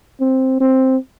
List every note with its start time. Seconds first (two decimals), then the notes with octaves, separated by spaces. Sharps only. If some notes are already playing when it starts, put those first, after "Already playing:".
0.21 C4
0.61 C4